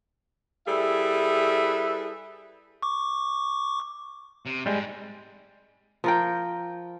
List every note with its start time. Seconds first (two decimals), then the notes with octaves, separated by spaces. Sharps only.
0.67 G3 E4 G#4 A4 B4 E5
2.82 C#6 D6
4.46 C3
4.66 E2 G#2 G3 G#3
6.04 F3 A#4 G5